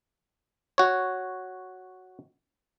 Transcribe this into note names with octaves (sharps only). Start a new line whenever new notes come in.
F#4 C#5